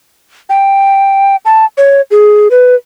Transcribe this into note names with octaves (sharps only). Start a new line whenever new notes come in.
G5
A5
C#5
G#4
B4